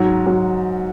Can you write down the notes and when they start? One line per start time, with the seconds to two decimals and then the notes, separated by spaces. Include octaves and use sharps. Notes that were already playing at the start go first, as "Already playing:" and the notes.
Already playing: G#2 F#3
0.27 F#3